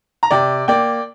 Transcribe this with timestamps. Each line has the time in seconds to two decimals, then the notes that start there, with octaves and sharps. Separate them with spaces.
0.23 A#5
0.31 C3 D5 G5
0.68 A#3 D5 G5